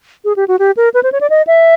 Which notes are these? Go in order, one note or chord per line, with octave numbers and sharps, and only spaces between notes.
G#4
G4
F#4
G4
A#4
B4
C5
C#5
D5
D#5
E5